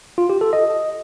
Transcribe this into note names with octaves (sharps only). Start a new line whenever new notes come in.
F4
G4
A4
D#5